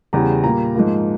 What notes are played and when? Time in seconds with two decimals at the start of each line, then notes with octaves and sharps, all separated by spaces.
0.13 E2 C#3 G3 A#5
0.44 A#2 G3 A#3 A#5
0.75 G#2 F3 A#3